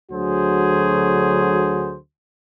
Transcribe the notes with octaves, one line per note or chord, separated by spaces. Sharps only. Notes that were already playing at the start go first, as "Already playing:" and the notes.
D2 D3 F#3 F#4 G#4 C5